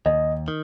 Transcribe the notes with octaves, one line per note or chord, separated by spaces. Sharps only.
D#2 D#5
D#3